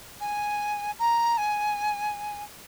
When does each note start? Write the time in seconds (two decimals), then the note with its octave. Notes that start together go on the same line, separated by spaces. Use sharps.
0.20 G#5
0.99 A#5
1.37 G#5